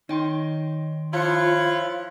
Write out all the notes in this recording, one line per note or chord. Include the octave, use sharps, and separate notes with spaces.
D#3 D#4 C#5 G5 C6
F3 E4 F4 C#5 C6 F#6 C#7